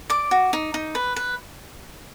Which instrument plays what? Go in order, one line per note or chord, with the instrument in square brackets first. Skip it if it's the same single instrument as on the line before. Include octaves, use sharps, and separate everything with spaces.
[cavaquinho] D5 D6
F#4
D#4
D#4
B4
B4